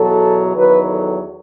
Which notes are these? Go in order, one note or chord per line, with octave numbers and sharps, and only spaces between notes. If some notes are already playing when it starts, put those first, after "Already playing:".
Already playing: E2 B2 F#3 A4
E2 D#3 F#3 B4
A4